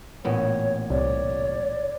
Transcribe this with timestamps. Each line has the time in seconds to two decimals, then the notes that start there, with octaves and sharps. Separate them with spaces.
0.25 A1 A#2 B3 C#5
0.90 C2 C#5 D5